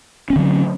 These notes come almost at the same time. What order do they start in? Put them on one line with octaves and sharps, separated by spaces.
C#4 C4 D3 F#3